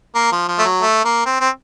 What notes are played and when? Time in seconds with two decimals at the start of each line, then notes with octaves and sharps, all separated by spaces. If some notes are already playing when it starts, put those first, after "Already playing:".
0.15 A#3
0.32 F3
0.48 F3
0.59 A3
0.65 F#3
0.82 A3
1.05 A#3
1.26 C4
1.40 C4